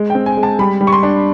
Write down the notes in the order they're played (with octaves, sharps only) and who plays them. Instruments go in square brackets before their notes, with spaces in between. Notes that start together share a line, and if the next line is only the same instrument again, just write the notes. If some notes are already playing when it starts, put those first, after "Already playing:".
Already playing: [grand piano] G#3
G5
C4
G#5
G#3
A5
G3 B5
G3
C#6
C6
D4